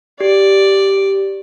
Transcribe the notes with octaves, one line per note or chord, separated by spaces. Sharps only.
G4 D5